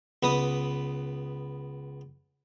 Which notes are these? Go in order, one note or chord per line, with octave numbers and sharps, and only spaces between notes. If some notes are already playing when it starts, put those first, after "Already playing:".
C#2 B3 B4 D#5 D#6